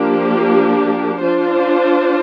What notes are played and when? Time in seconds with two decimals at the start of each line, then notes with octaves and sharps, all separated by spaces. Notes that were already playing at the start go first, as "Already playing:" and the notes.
Already playing: F3 A#3 D4 G4
1.22 D4 F4 C5